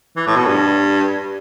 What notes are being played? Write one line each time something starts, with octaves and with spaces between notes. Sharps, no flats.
E3
A2
B2
G2